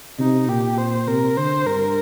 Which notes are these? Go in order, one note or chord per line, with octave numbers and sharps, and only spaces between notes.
C3 D#4
A#2 G4
C5
C3 A#4
D3 C5
G2 A#4